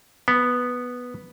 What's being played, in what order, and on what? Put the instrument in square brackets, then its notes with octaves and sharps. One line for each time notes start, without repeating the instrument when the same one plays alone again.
[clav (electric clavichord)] B3